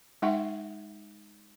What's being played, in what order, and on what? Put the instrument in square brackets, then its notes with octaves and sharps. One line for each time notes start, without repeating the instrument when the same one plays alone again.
[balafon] G#3 D#4 E5 F#5 G5 C#6